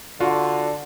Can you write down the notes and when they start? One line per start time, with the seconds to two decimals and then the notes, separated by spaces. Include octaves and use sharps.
0.20 D3 F4 F#4